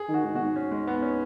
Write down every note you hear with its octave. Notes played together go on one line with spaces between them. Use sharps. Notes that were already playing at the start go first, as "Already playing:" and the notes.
Already playing: G#4
D#3
F#4
G#2
B2 F#4
G#2
C#4
G#3
B3
C#4